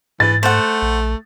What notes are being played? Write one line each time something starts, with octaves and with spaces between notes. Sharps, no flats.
G#2 E3 A6
A3 C5 F#5
A#1